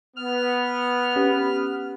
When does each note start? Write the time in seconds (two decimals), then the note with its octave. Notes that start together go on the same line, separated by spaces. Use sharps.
0.16 B3 F6
1.16 C#4 G4